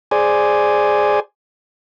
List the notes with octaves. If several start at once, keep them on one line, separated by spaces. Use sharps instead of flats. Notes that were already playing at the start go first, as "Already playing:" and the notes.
G#4 C5 D5 G#5